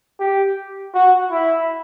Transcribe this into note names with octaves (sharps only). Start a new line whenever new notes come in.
G4
F#4
E4